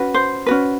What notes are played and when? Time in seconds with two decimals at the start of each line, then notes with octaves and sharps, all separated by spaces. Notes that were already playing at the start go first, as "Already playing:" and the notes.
Already playing: C#4 F#4 B4
0.14 C5
0.46 C#4 F#4 B4